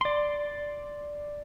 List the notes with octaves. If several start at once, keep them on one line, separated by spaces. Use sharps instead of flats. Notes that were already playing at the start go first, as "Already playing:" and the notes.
D5 C6